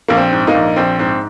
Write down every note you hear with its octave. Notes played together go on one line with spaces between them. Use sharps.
A#1 A#3
C4
G#2
A#3 D#4
A#1
A#1 C4
G#2 C4